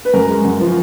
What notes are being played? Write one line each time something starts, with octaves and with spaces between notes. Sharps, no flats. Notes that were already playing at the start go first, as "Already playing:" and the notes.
B4
F#2 A#4
G#3
F#2
F3